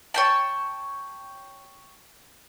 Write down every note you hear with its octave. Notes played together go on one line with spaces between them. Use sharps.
C#5 G5 A5